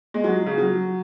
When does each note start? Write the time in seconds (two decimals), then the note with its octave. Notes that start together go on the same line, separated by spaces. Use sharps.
0.14 G#3
0.24 F#3
0.46 C#3
0.58 F#3